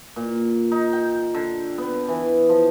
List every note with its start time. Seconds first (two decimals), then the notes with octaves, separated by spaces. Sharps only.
0.16 A#2
0.71 D#4
0.93 G5
1.34 D3
1.78 B3
2.08 E3
2.49 F3